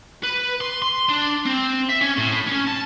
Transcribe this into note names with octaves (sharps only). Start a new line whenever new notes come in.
B4
C6
C6
D4
C4
E5
C#4
A2
C#4
A5